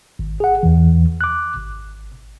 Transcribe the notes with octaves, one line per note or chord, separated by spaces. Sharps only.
G#1
G#4 F#5
E2 E3
D6 F#6
G#1